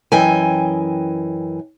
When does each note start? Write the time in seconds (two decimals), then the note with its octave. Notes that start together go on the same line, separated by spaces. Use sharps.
0.12 F#2 E3 D#5 G5 G#5